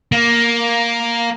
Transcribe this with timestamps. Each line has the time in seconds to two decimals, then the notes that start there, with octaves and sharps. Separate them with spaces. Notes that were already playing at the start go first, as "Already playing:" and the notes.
0.12 A#3